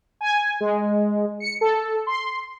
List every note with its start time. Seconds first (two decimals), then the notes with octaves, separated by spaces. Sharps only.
0.21 G#5
0.61 G#3
1.40 C#7
1.61 A4
2.07 C6